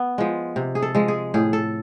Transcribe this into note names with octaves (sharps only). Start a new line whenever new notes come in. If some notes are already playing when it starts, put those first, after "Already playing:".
Already playing: B3
F3 G#3
C3
G#4
A4
F3 G#3
G#4
A2 G#4
A4